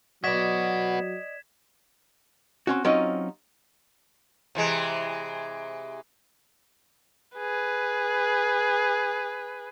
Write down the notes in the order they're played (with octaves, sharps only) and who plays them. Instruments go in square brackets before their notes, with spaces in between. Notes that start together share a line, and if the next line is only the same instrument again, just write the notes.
[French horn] F#3 [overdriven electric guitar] B3 F#4 [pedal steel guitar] D5 D#5 [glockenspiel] G#6 B6 E7
[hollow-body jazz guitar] C4 C#4 F#4
F#3 C4 C#4 D#4 F4 D#5
[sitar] C3 E3 G#3
[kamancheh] G#4 B4